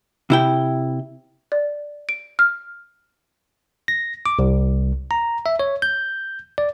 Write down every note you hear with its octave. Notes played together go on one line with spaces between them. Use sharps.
C3 E4 G5
D5
D7
F6
A#6
D6
C2
A#5
E5
C#5
G6
D5